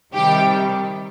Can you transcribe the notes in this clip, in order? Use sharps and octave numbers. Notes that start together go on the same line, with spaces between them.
C3 D#3 G3 G4 G5